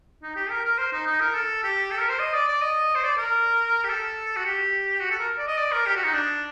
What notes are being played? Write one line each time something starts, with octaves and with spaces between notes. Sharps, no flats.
D#4
G4
A#4
A#4
C5
D#4
D#4
A#4
A4
G4
A4
A#4
C5
D#5
D5
D5
D#5
C5
D5
A#4
G4
A4
F#4
G4
F#4
A4
A#4
D5
D#5
D5
A#4
G4
F#4
D#4
D4